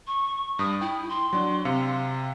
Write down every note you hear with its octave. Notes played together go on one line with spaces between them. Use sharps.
C#6
G2 D#6
E4 G5
C6
F#3 D4
C3 F5 C#7